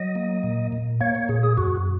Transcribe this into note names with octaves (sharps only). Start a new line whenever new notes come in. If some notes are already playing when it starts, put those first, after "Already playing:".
Already playing: F#3 D#5
A#3
A#2
A#2
A#3 C#5
C#5
A#2 G#4
G#4
F#2 F#4